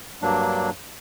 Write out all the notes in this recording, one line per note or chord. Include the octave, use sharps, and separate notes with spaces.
G2 F#3 A#3 D4